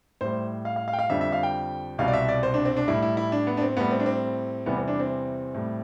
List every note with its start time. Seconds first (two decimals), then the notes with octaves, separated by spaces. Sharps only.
0.21 A2 G3 C5
0.65 F5
0.76 F5
0.88 F5
0.93 G5
0.99 F5
1.10 F2 D3 G3 E5
1.21 E5
1.32 F5
1.43 G5
1.99 C2 B2 G3 F5
2.08 D5
2.13 E5
2.28 D5
2.43 C5
2.54 D4
2.65 C4
2.77 D4
2.88 A2 G3 E4
3.02 E4
3.17 E4
3.32 D4
3.47 B3
3.57 D4
3.62 C4
3.77 A2 G3 B3
3.91 C4
4.00 D4
4.06 C4
4.66 E2 C3 E3 G3 B3
4.77 C4
4.88 D4
4.99 C4
5.55 A2 G3